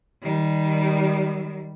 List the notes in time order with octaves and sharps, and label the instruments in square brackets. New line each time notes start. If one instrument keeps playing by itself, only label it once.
[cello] D#3 G3